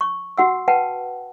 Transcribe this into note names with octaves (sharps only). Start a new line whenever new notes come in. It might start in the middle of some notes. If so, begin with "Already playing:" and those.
C#6
F#4 F#5 E6
B4 F#5 G5 A5